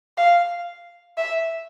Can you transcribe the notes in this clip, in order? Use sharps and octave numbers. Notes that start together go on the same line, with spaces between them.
F5
E5